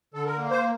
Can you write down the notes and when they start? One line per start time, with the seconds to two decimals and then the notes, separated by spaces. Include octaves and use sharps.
0.14 D3 A4
0.26 A#4
0.38 A#3
0.51 C5